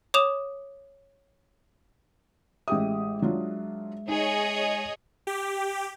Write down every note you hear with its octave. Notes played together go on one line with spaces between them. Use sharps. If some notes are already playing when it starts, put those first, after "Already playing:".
C#5 D6 D#6 E7 F7
A1 G#3 G4 E5 D#6
F#3 D4 F4
D#4 G#4 C#5 D#5
G4